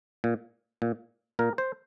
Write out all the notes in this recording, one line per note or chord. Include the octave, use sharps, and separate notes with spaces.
A#2
A#2
A#2 A#4
C5